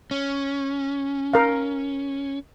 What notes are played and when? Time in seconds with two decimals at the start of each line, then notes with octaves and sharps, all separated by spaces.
0.11 C#4
1.33 A#4 F5